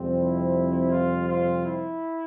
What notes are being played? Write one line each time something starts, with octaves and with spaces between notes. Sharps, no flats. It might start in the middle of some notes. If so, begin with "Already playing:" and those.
Already playing: F2 C3 G3 C4
E4
F4
F4
E4